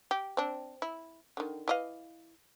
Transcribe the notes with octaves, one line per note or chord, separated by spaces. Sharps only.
G4
C4 D4
E4
D3 D#3
E3 D#5 F5